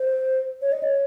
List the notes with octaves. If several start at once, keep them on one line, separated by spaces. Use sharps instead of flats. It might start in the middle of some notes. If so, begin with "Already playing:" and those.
Already playing: C5
C#5
D#5
C#5